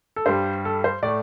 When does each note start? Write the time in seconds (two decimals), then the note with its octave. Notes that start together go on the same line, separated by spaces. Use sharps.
0.16 A4
0.26 G2 G3 C5
0.65 A4
0.84 C5
1.03 A2 A3 D5